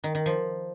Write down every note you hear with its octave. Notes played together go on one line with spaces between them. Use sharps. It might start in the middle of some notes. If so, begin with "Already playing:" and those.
D#3
D#3
F3